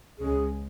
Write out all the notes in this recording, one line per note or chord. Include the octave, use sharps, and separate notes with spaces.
C#2 C#3 G#3 C#4 G#4